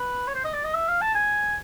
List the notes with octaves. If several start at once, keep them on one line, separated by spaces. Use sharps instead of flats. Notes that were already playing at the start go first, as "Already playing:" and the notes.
Already playing: B4
C#5
C5
D#5
D5
D#5
E5
F5
A5
G#5